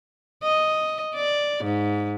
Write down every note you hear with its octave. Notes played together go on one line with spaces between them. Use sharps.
D#5
D5
G#2